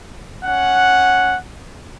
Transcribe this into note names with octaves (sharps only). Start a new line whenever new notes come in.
C#4 F#5